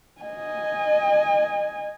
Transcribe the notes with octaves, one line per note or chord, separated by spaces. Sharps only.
D#5 G#5